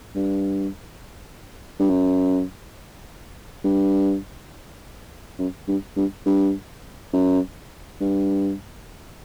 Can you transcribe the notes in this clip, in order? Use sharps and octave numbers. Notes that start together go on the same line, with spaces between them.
G2
G2
F#2
G2
F#2
G2
G2
G2
F#2
G2